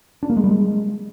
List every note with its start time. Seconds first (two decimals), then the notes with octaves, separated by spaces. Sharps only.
0.23 D4
0.30 A#3
0.37 G#3
0.44 G3
0.51 G#3